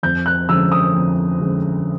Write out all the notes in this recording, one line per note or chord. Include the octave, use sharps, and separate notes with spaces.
F2 G6
F#6
D3 F3 G#3 C#4 E6
D#6
F2
D3 F3 G#3 C#4